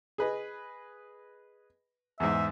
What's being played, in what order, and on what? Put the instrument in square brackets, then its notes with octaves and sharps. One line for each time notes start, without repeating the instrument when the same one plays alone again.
[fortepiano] G#4 B4 D#5
[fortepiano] E2 G#2 [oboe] E5